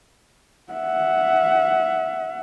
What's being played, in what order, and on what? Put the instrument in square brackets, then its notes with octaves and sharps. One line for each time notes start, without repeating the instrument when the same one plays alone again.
[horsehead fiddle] E5 F#5